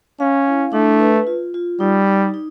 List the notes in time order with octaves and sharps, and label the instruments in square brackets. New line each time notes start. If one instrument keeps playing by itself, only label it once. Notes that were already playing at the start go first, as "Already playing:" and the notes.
[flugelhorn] C#4 [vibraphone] F5
[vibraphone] E4
[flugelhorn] A3 [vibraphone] D4
[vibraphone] B4
F4
F4
[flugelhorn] G3 [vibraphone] D#4
[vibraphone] D#4
D#4